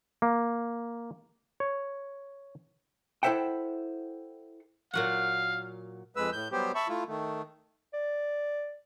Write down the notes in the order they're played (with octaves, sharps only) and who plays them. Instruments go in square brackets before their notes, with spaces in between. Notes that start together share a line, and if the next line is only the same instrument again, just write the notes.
[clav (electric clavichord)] A#3
C#5
[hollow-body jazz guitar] E4 A4 C5 E5 F#5 G5
[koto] A#2 F#3 F#5 [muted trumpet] F5
[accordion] F2 G#3 B4 E6
A2 G6
F#3 G3 B3 G4 C5
E5 A5 B5 C#6
A3 E4 F4
D#3 A3
[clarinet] D5